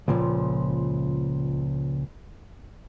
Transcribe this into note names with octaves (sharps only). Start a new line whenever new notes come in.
C#2 A#2 F3